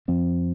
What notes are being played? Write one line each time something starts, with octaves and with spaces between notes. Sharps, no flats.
F2 F3 C4